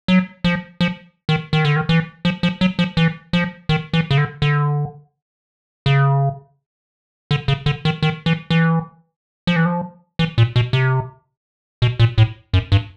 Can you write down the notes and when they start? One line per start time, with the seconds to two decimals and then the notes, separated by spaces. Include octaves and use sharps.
0.08 F#3
0.44 F3
0.81 F3
1.29 D#3
1.53 D#3
1.65 D3
1.76 D#3
1.89 E3
2.25 F3
2.43 F3
2.61 F#3
2.79 F3
2.97 E3
3.33 F3
3.69 D#3
3.93 E3
4.11 C#3
4.18 D3
4.42 D3
5.86 C#3
7.31 D3
7.48 C#3
7.66 D3
7.85 D#3
8.03 D#3
8.26 E3
8.50 E3
9.47 F3
9.56 E3
9.65 F3
10.19 E3
10.38 A#2
10.56 B2
10.73 C3
11.82 B2
12.00 A#2
12.18 A2
12.54 F#2
12.72 G2